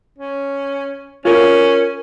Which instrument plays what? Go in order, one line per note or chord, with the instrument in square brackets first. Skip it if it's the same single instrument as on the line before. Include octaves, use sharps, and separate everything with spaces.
[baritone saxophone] C#4
[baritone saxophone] C#4 [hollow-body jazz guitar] F4 A#4 G#5